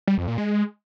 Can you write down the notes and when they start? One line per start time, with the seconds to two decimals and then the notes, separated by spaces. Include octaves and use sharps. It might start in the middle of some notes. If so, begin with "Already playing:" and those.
0.07 G3
0.18 F2
0.28 A#2
0.38 G#3